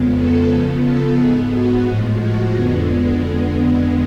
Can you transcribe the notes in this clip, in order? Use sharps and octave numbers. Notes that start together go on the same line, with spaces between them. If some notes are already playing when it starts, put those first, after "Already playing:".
Already playing: F2 C#3 G#3 B3
A4
C#3 F3 B3
A4
G#2 G#3 B3 G#4
F#4
A2 F3 G#3
F#4
F2 D3 G#3 B3